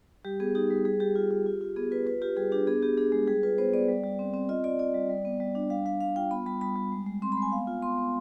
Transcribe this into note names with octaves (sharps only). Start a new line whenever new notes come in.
G3 G4
B3 G#4
D#4 G4
G3
G3 G#4
G3 G4
F4
F4
F4
F4
B3 G#4
F4 B4
F4 B4
F4 G4
G3 G#4
D4 G4
B3 G#4
B3 G4
D4 G#4
G#3
G3 G#4
F4 B4
B3 C5
B3 D5
G3
G3
C4
C4
F4 D#5
F4 D5
F4 D5
G3
G3
B3
G3
D4
G3 F5
G3 F5
G3 F5
F4 G5
B3 B5
G3 B5
G3 B5
G3
G#3
G#3
C4 C6
B5
G#3
G#5
B3 F5
F4
B3 C6
B3